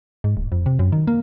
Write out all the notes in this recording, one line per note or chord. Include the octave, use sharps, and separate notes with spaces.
G#2
D1
F2
C3
F#2
D#3
A#3